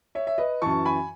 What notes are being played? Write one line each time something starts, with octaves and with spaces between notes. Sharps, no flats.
C#5 E5
E5
B4 D#5
F#2 E3 A5 C#6
G#5 B5